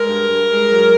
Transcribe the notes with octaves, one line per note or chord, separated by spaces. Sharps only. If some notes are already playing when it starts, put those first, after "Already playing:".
Already playing: G#3 A#4
G2
G2
G#3
F#3